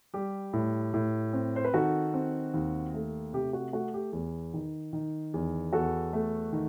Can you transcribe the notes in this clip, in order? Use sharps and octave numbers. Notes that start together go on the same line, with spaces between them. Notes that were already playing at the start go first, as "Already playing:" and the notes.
G3 G4
A2
A2
C4
C5
B4
D#3 F#4 A4
C4
D#2
A3
C3 G4
F#4
A3 F#4
G4
E2
D#3
D#3
E2
E2 F#4 A4
A3
D#3